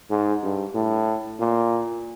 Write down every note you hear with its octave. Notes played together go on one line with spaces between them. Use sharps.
G#2
G2
A2
A#2